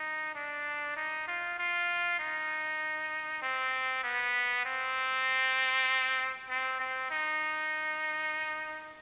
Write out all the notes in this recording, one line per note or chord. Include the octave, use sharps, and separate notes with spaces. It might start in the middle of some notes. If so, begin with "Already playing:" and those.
Already playing: D#4
D4
D#4
F4
F4
D#4
C4
B3
C4
C4
C4
D#4